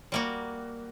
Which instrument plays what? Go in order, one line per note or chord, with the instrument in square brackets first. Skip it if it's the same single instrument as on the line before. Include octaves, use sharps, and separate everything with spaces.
[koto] G3 A#3 F#4